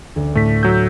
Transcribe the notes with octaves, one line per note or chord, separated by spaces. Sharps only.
D2
A2 A3 B6
F#3 E6 G6